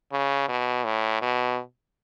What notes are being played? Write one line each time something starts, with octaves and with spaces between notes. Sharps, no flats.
C#3
B2
A2
B2